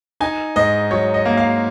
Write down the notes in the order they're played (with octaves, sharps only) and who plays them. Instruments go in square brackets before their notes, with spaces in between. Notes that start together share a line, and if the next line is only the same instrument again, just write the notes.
[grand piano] D#4 G#5
G#2 D#5
F#3 C#5
D#5
A#3
F5